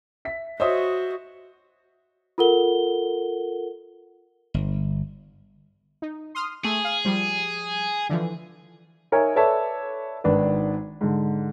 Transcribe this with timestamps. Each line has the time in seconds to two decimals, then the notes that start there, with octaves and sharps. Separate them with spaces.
0.25 E5 B6
0.60 F#4 C5 C#5 D#5 E5 D#6
2.38 F4 A4 A#4 F#5 G7
4.54 G1
6.02 D#4
6.35 C6 D#6 F6
6.65 A3 G#4
6.85 F5
7.05 F3 G3
8.09 D3 E3 F3
9.12 D#4 A#4 C#5 E5 G#5
9.36 A4 B4 C#5 D5 E5 A5
10.24 G#1 D#3 D4 B4
11.01 G#2 D3